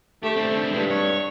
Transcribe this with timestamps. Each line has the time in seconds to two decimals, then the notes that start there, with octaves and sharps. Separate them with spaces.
0.23 A3 G4
0.36 C4 D4
0.72 G2 G#3 E4
0.90 C#5